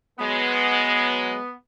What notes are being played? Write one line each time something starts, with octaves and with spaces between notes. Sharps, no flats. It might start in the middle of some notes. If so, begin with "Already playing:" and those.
F#3 G#3 B3